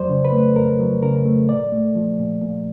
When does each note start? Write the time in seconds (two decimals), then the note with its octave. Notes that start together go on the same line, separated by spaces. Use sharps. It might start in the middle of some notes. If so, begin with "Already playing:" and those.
Already playing: F2 F#3 C5 D5
0.09 C#3
0.25 B4
0.32 A3
0.56 F2 A#4
0.79 F#3
1.03 C#3 A#4
1.26 A3
1.49 A#2 D5
1.72 A3
1.95 F3
2.19 A#2
2.42 A#2